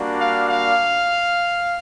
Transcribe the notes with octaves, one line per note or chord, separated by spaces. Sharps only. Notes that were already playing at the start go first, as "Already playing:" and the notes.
Already playing: G3 A#3 D4 F#4
F5
F5